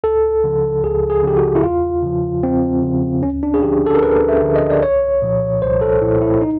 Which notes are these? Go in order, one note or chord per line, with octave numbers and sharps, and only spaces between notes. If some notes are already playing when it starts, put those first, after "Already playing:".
C#2 A4
C#3 F3
C#2 G#4
G#4
C#3 F3 G4
F#4
E4
E2 F4
C#3 F3
E2 C4
C#3 F3
D2 C#4
D4
G#4
D3 F3 G4
A4
A#4
D2 B4
E5
D3 F3
D#5
D5
C2 C#5
A#2 F3
C2 C5
A4
A#2 F3 E4
E4
D#4